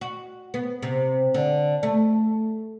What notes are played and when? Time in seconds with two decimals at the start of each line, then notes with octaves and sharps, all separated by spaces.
0.01 F#4
0.54 B3
0.83 C3
1.34 D3
1.83 A3